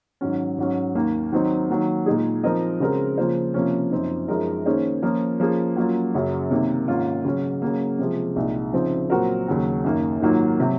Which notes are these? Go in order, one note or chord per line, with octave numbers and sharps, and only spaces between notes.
G#2 D#3 F#3 C#4
G#2 F#3 C#4
D#2 D#3 A#3
D#3 F#3 C4 D#4
D#3 F#3 A#3
A#2 G#3 D#4 G#4
F3 C4 D#4 A#4 D#5
C#3 G#3 C4 F#4 A#4
C#3 F3 A#3 F4 C5
C3 F3 A#3 C#4
F#2 F3 C4 D#4
F#2 F3 G#3 D#4 A#4
D#3 A#3 C#4 G#4 C5
F3 A#3 C#4 F4 A#4
F3 A#3 C#4 G#4
F#3 A#3 C#4 F4
F#2 C#3 F#3
C3 D#3 A#3
G#2 D#3 A#3 C#4 F4
C#3 F#3 C#4
C#3 F#3 A#3
C3 F3 G#3
C2 A#2 G#3 D#4
C#3 F3 C4 D#4
A#2 F#3 C4 F#4 A#4
D#2 C#3 F#3 C#4
F#2 D#3 A#3
G#2 D#3 F#3 A#3 F4
C3 F#3